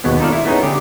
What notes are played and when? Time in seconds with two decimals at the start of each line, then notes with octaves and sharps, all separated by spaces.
0.04 D#2 B2 G#3 B3
0.20 D#4 F4 A4 D5 F5
0.32 E4
0.45 A3 B3 C#4 D#4 G#4
0.63 D3 G4